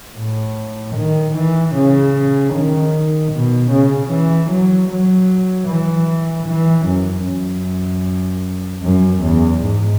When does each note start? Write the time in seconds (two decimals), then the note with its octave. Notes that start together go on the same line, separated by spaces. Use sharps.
0.17 A2
0.96 D#3
1.36 E3
1.76 C#3
2.54 D#3
3.33 B2
3.71 C#3
4.11 E3
4.51 F#3
4.90 F#3
5.68 E3
6.47 E3
6.86 F#2
7.25 F#2
8.83 F#2
9.22 E2
9.62 G#2